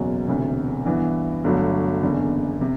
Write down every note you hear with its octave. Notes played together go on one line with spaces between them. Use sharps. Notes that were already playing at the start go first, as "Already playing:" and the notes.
Already playing: F#1 E2 B2 F#3
E1 D2 C3
G2 E3 B3
G1 G2 F#3 A3
F#1 E2 D3
C3